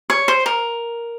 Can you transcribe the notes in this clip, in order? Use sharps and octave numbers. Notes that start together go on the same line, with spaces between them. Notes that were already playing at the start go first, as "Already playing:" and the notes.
C#5
C5
A#4